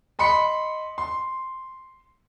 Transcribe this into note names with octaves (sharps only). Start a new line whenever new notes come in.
D#5 B5 C6 C#7
C6